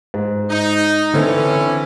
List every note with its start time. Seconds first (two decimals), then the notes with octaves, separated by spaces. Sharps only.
0.14 G#2
0.50 D#4
1.13 D3 E3 C4 C#4 A4